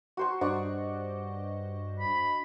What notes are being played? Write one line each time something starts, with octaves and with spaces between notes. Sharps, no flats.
F#4 C5 C#6
G2 D4 C5 D5 D#5 F#5 C#6
B5